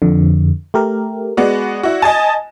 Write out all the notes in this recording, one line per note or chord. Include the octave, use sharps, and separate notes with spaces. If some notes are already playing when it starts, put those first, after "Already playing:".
F2 D3
A3 G4 A#4
G#3 B3 F#4 D5
E4 F#4
D#5 G#5 A5